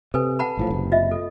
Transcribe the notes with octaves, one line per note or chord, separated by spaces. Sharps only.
C3 A4 B4 G#5
F#5 A5 B5
A#1 A2 F3
F#1 C3
F4 D#5 E5
A4